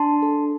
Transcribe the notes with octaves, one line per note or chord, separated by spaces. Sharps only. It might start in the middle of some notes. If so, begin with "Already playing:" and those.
Already playing: D4 A5 C6
A4